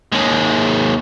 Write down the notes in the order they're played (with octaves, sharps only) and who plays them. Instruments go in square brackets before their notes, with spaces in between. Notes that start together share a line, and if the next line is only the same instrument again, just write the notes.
[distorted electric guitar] D#2 G#3